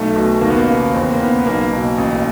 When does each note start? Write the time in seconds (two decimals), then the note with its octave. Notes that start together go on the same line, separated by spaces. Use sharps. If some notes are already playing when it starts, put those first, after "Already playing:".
Already playing: B1 A3
0.16 B2
0.41 D#2 A#3
0.50 B3
0.58 A#3
0.68 C#3
0.94 E2 C4
1.03 B3
1.13 A#3
1.19 C#3 B3
1.39 B3
1.46 B1 A#3
1.72 B2
1.98 A1